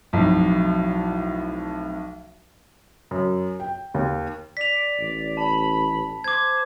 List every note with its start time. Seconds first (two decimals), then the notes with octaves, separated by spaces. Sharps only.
0.13 B1 F2 A2
3.11 F#2
3.60 G5
3.94 D#2
4.57 D5 B6 F7
4.99 A1
5.37 A5 B5
6.24 C5 D6 G#6